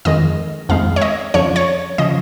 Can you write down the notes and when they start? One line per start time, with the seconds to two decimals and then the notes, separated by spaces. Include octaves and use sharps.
0.05 F2 D#3 G#3 D#5
0.69 F2 D#3 G#3 F5
0.96 C#5
1.01 D#5
1.34 F2 C#3 F3 C#5
1.56 C#5
1.98 C#3 F3 D#5